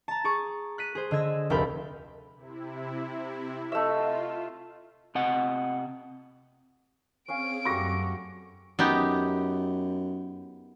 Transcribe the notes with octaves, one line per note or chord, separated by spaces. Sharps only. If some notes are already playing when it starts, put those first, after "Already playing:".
A5 A#5
G#4 C#6 D6
F#6 B6 D#7
G#4 C5
D3 D#5 E6 G#6 A#6
F1 D2 A4 A#4 G5 B5
C3 E4
A3 F4 D#5 E5
C3 D#5 F#5
C4 C#4 G#4 F5 G#5 D7
F#2 G3 A3 F#4 C#6 D6 A#6
F#2 B3 D#4 G4